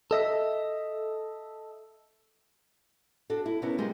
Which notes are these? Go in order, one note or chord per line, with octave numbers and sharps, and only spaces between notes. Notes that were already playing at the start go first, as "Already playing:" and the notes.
A4 D#5 E5
D4 F#4 A4
E4
C3 B3 C#4 E4 A#4
G3 G#3 F4 G4 A#4